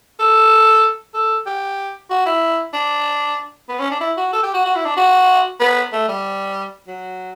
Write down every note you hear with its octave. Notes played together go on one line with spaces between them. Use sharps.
A4
A4
G4
F#4
E4
D4
B3
C#4
D4
E4
F#4
A4
G4
F#4
F#4
E4
D4
F#4
B3
A3
G3
F#3